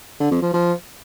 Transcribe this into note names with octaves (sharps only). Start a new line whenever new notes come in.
D3
F2
F3
F3